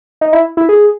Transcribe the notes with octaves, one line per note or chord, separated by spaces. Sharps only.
D#4
E4
E4
G#4